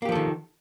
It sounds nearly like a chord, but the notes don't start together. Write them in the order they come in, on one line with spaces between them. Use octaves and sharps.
A#3 G4 F3 A4 D#3